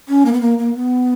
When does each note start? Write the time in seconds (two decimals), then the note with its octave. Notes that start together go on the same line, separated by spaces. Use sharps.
0.08 C#4
0.26 A#3
0.33 B3
0.41 A#3
0.58 A#3
0.75 B3